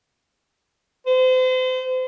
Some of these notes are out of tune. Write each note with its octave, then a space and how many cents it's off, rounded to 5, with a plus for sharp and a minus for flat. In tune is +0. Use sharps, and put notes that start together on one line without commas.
C5 -35